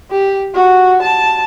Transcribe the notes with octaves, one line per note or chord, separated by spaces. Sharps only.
G4
F#4
A5